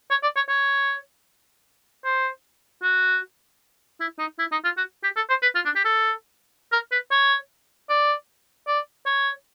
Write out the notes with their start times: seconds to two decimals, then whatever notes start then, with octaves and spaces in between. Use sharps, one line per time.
0.11 C#5
0.23 D5
0.36 C#5
0.49 C#5
2.04 C5
2.82 F#4
4.00 E4
4.19 D#4
4.39 E4
4.52 D#4
4.64 F4
4.77 F#4
5.03 G4
5.16 A4
5.29 C5
5.42 B4
5.55 F4
5.65 D4
5.75 G4
5.85 A4
6.72 A#4
6.92 B4
7.11 C#5
7.89 D5
8.67 D5
9.06 C#5